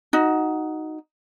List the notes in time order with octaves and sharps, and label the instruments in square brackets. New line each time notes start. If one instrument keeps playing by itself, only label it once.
[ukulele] D#4 F#4